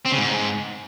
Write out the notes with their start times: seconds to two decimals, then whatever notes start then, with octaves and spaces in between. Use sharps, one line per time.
0.05 C4
0.12 C#3
0.18 G#2